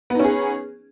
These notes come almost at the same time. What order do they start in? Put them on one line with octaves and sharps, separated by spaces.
B3 D#4 C#4 G#4